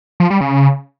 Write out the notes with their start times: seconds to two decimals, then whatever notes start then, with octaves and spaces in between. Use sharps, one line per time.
0.20 F3
0.30 G3
0.41 C#3